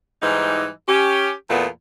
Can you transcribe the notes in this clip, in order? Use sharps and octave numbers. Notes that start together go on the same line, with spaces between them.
G#2 E3 G3 D#4
C#4 G4
E2 A#2 A3 B3